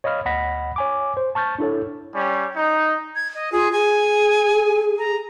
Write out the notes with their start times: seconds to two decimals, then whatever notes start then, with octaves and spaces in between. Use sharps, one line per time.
0.04 C#5 D#5 F5 B5 F6
0.25 D2 D#5 F#5 B5 A#6 B6
0.76 C#5 G#5 D6
1.17 C5
1.35 A5 C#6 F6 G6 A6
1.59 D4 E4 A4 C#5
2.14 G3 C#4
2.55 D#4
3.15 G#6
3.35 D#5
3.52 F4 G#4
3.72 G#4 G#5
4.99 A#5